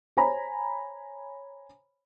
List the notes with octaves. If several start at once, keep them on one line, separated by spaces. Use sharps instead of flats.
C5 C#5 G#5 A#5 B5